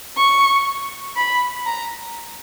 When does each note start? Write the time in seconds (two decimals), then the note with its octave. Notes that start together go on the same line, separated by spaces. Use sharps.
0.17 C#6
1.16 B5
1.66 A#5